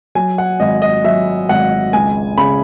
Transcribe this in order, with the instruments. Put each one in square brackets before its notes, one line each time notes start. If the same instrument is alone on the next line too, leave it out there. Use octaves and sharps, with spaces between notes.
[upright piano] F#3 G#5
F#5
G#1 D#5
D#5
F#3 E5
G#1 F#5
C#2 G#5
C#3 B5